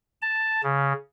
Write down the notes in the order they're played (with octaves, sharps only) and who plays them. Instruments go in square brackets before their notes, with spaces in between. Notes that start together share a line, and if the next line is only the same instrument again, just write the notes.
[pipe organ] A5
C#3